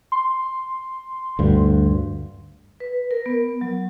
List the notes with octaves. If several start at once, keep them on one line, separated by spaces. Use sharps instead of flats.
C6
D2 G2
B4
A#4
B3
F#3